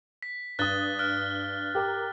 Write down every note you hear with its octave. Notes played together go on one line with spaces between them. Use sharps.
B6
G2 D#6 F#6 A6 G7
F6 F#6
G4 A#4